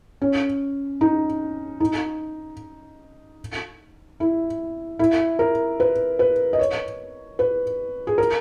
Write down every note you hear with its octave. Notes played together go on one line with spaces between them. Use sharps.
C#4
D#4
D#4
E4
E4
A#4
B4
B4
D#5
C#5
B4
G#4
A#4